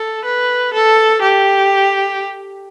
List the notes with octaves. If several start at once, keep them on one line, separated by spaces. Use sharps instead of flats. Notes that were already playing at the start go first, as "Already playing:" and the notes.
Already playing: A4
B4
A4
G4